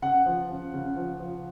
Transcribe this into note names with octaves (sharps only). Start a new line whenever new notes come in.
C#3 F#5
F3
C#3
C#3
F3
F3